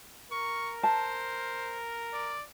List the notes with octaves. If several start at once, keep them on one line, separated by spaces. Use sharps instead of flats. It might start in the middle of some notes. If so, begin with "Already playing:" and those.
A#4 C#6
C5 A5
D5